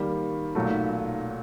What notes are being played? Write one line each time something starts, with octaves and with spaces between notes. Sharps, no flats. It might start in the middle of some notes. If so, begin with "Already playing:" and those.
Already playing: D#3 G3 A#3
B1 A#2 F#3 A3